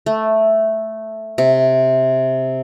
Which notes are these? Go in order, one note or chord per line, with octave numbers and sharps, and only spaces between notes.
A3
C3